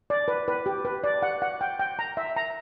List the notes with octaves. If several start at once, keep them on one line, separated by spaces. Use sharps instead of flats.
D5
B4
B4
G4
B4
D5
F#5
F#5
G5
G5
A#5
E5
A#5